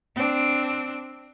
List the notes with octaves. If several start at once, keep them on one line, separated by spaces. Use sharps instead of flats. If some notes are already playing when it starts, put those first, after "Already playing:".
C4 D4